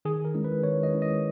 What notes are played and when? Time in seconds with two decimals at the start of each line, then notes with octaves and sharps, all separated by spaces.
0.05 D#3 G#4
0.25 A#4
0.35 G#3 C#4 E4
0.44 B4
0.63 D#3 C#5
0.83 D#5
0.93 G#3 C#4 E4
1.02 D#5